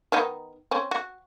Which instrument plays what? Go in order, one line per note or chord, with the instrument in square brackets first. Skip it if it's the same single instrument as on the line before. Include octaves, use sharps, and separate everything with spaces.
[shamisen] D#3 B3 D#4
C4 C#4
F#4